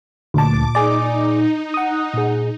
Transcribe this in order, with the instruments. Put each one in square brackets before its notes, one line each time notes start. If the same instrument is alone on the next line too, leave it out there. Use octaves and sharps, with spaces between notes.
[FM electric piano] D2 A5 [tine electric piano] A#2 [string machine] D6
[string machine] D#4 [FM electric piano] G#4 D5
[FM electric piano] F#5 D#6
[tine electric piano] A#2 G#4